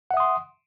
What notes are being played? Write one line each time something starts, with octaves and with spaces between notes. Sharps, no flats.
E5 F#5 C6 D#6